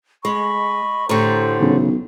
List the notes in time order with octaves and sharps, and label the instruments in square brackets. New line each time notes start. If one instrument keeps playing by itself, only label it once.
[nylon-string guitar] G#3 [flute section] D#5 B5 C#6
[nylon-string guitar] A2 D3 [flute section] G4 A4 C5 [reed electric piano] A#5 C#6
[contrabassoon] B1 [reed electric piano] G#2 C#3 E3